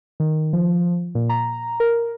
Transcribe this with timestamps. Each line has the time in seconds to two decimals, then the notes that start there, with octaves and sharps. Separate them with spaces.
0.20 D#3
0.53 F3
1.15 A#2
1.29 A#5
1.80 A#4